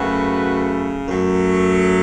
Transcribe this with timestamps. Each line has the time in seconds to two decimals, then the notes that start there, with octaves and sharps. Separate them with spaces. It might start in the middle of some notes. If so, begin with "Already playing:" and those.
Already playing: F#2 C#3 A3 F#4 B4
1.07 F#2 F#3 A3